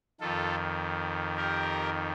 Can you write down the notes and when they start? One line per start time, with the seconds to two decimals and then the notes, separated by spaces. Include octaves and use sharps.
0.21 F2 D#3 F4 A4
1.37 G4 A#4